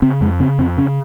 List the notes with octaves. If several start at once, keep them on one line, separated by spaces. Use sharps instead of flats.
C#3 C4
F2 G#3
C#3 C4
F2 C4
C#3 C#4